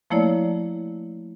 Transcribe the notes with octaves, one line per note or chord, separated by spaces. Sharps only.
F3 A3 A#3 E4 C#5 D5